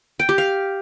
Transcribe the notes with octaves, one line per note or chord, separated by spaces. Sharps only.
G5
G4
F5